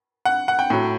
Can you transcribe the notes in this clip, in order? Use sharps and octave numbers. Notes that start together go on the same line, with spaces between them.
F#5
F#5
G5
A2 F#3